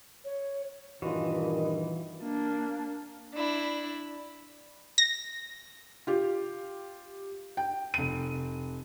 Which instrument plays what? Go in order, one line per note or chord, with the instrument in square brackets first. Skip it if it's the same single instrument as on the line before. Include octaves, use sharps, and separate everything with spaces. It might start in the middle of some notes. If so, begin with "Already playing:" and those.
[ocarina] C#5
[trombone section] G2 A#2 D#3 [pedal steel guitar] E3 [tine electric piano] F4 F#4 [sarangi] D#5
[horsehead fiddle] A#3 D4
[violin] D4 E4
[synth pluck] A#6
[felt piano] F4 G4
G5
F1 D#7